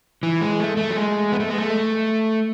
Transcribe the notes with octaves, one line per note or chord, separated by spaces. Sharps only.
E3
G#3
A3
A3
F#3
G#3
B3
A3
G#3
A3